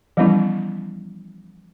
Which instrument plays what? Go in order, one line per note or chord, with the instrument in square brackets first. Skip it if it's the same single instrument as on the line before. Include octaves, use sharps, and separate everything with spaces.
[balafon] E3 F3 G3 B3 C#4 E4